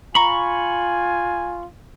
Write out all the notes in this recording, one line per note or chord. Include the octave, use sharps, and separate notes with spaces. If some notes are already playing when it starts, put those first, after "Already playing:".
F4 G#5 A#5 B5 C#6